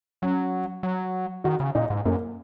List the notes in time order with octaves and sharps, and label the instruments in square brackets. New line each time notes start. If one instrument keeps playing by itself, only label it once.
[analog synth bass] F#3 [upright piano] C#4
[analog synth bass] F#3
[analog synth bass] D#3 [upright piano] F#4
[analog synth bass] C#3
[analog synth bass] A#2 [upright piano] D#4
[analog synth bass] G#2
[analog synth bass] F#2 [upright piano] A#3